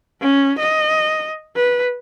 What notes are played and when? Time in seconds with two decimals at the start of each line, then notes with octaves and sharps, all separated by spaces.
0.21 C#4
0.59 D#5
1.55 B4